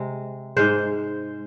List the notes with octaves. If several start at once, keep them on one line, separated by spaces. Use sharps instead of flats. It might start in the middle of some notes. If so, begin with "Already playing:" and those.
Already playing: C3 G#3
G#2 G#3 C5